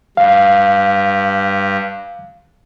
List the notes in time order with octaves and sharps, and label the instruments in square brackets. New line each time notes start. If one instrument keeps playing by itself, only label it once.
[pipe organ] G2 [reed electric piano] F5